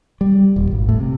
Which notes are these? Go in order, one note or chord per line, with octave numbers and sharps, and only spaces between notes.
G3
D#1
G#1
A2
C3